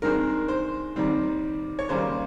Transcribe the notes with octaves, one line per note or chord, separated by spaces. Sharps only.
G2 D#3 G#3 C4 A#4
C5
D#2 D#3 G3 C4
C#5
D#2 C#3 G3 A#3 C5